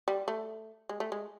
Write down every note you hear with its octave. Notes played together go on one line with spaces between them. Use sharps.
G3
A3
G#3
A3
G#3